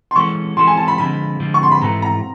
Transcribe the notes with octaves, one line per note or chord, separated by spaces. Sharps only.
C6
E3 G#3 C#4 F#4 A4 C#6
E3 G#3 C#4 F#4 A4 C6
G#5
A5
B5
D3 F3 G#3 B5
D3 F3 G#3
C#6
C6
B5
G#2 E3 A3 A#5
A#5